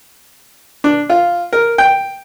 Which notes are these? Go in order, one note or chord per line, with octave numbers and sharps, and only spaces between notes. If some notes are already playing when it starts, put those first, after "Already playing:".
D4
F4
A#4
G5